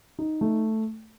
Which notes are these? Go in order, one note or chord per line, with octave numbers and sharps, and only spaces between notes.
D#4
A3